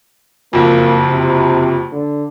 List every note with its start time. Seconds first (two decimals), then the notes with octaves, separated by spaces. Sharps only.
0.53 F#1 F2 A#3
1.09 C3
1.93 D3